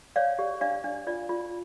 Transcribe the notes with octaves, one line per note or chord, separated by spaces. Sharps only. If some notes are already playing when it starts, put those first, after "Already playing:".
C#5 D5 F5
G4
D4 D5 F5
D4
F4 D5
F4